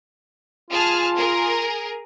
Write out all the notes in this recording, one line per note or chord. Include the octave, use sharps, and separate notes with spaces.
F4 G#4 A5 F6
G#4 A#4